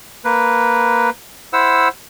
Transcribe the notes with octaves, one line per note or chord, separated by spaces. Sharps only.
A#3 B4
E4 C5 F#5 E6